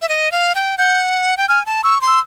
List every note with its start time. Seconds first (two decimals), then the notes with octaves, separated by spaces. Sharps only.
0.02 E5
0.09 D#5
0.32 F5
0.55 G5
0.78 F#5 G6
1.37 G5
1.48 G#5 F6
1.66 A5
1.83 C#6 E6
2.01 C6
2.07 E6